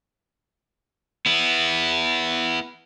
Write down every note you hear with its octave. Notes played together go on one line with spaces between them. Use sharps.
B3 E4